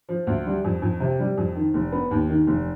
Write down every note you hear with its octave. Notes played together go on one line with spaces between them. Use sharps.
F3
D2
G3
F2
F2
C3
G3
F2
D#3
F1
B3
D#2
D#3
F1